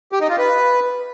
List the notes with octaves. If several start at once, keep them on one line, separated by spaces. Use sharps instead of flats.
G4
D#4
F4
B4